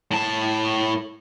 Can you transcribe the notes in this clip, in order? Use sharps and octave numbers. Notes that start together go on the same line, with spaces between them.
A2 A5